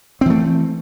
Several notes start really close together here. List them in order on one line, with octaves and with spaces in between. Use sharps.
C4 E3 A3